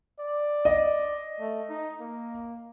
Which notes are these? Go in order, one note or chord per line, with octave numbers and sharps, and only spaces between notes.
D5
D#5
A3
D#4
A#3